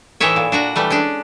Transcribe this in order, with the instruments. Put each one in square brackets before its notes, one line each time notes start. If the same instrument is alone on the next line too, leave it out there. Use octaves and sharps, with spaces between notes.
[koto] A2 E3 D#4 E4 C#5 E5
A#2
D4 F#4 A#5
E3 G3 A3
G#3 C#4 D4